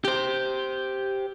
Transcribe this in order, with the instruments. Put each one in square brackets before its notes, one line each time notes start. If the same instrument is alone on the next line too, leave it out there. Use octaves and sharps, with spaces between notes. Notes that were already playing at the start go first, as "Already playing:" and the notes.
[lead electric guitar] G4 C5